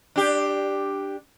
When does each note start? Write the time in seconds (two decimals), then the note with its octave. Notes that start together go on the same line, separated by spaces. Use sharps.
0.16 D4 G4